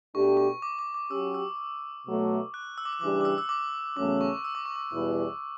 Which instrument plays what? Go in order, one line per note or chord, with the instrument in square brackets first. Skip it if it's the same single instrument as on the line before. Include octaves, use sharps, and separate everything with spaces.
[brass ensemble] B2 A3 D4 G4 [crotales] C#6
[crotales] C#6
D6
D6
D6
[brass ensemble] F#3 C#4 G4 [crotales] E6
[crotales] E6
[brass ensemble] B2 F#3 A3
[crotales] F#6
E6
D6
E6
[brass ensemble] C#3 E3 G3 D4 G4 [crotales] D6
[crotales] D6
E6
E6
D6
[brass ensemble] E2 C#3 F#3 A3 C#4 [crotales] D6
[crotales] C#6
E6
D6
C#6
D6
[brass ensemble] E2 B2 G3 B3 E4